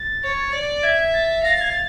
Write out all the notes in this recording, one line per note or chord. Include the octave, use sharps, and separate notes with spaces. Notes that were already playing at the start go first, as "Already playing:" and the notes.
Already playing: A6
C#5
D5
E5 G#6
A6
A6
F5 A#6
A6
G#6
A6